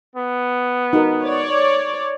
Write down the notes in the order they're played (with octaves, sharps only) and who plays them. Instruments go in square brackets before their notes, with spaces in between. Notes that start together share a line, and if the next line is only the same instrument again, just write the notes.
[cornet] B3
[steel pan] D#4 F#4 A#4
[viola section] C#5 D5